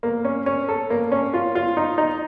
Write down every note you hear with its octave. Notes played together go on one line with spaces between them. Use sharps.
A#3
C#4
C#4
A4
A#3
C#4
F4
F4
D#4
D#4